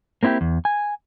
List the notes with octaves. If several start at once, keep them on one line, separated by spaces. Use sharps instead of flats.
A#3 C4 E4 F4 G4
E2
G#5